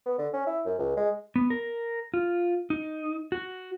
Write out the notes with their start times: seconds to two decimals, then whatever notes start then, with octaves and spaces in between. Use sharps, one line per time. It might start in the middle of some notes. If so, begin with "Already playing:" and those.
0.06 B3
0.18 D3
0.34 C#4
0.47 E4
0.66 F#2
0.79 C#2
0.97 G#3
1.36 B3
1.50 A#4
2.14 F4
2.70 D#4
3.32 F#4